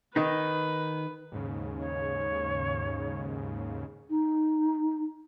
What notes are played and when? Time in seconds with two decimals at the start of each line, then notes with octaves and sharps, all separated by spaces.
0.16 D#3 D#4 B4
1.32 D#2 G#2 C#3
1.81 C#5
4.10 D#4